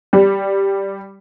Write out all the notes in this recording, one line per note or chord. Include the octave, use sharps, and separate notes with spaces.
G3